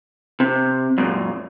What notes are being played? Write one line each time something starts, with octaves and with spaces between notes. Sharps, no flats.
C3
F#2 A#2